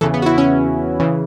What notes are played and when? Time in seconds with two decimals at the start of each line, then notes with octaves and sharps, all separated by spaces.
0.01 E2 C#3 E3 A4
0.14 B3
0.22 F#4
0.26 E4
0.38 C#4
1.00 C#3 E3